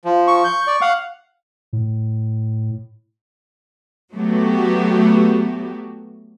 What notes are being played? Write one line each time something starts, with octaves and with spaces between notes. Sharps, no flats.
F3
C#6
G6
D5
F5 F#5
A2
F#3 A3 B3 F#4 G4